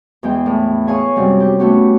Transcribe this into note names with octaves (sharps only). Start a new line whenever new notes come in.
E2 G#3 G5
A2
G#4 C#5 F5 G#5 C#6 D#6
F#2 C3 G3 G#3
G4
A3 B3 C#4 F#4 G4